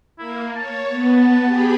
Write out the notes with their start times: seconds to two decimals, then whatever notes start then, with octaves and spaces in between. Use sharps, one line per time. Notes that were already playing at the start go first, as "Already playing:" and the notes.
0.18 A#3 E4
0.56 C#5 A5
0.88 B3
1.45 G4 G#4 B5